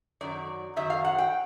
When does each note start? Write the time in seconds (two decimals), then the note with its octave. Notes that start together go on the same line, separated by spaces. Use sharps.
0.21 F#2 D#3 F#3 D5
0.76 F#2 D#3 F#3 E5
0.90 F5
1.05 F#5
1.18 G5